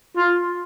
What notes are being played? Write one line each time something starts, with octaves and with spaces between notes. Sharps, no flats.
F4